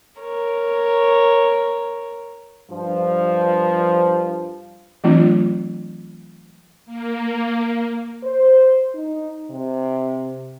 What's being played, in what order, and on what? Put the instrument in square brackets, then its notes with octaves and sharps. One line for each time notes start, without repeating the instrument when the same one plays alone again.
[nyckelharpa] A#4 C#5
[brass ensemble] G2 F3
[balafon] E3 F#3 A3 C4 D4 F4
[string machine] A#3
[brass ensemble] C5
D#4
C3